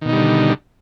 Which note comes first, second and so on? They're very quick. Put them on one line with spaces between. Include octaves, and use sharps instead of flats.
D#3 B2 D#4 G3 D3